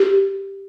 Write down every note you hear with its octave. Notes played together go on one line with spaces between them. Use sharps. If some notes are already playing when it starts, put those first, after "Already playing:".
Already playing: G4